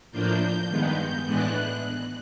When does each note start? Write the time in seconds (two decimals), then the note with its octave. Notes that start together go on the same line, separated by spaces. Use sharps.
0.12 A2 F3 A#3 D4 G6
0.69 G2 D#3 G#3 B3
1.25 A2 E3 G#3 B3 D4 F#6